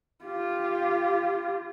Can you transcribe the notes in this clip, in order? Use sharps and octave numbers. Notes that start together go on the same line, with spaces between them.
F4 G4